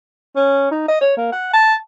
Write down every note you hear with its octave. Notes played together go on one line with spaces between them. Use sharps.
C#4
D#4
D#5
C#5
A#3
F#5
A5